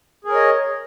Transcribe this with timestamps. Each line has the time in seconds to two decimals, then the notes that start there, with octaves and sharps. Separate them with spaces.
0.25 G#4
0.28 A#4
0.32 C#5
0.36 D#5